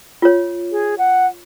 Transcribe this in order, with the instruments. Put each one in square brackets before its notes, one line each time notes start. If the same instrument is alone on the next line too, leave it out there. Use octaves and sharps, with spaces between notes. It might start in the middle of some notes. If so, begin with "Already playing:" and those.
[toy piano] F4 C#5
[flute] G#4
F#5